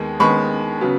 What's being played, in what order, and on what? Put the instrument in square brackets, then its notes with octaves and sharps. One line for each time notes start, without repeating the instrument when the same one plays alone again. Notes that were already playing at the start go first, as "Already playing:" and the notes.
Already playing: [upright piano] D#2 D#3 G#3 B3
D#2 D#3 G#3 B3 B5 C#6
C#3 F#3 B3